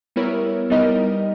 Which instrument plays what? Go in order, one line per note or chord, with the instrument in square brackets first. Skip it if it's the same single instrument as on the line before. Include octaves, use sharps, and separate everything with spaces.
[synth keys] G3 B3 E4 A#4 C#5
G3 B3 D#4 A#4 D#5